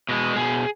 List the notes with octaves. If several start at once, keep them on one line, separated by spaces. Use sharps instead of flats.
B2 G#3
B2 G#4